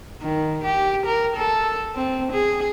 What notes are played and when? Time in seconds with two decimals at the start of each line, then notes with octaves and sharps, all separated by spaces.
0.21 D#3
0.64 G4
1.06 A#4
1.36 A4
1.95 C4
2.32 G#4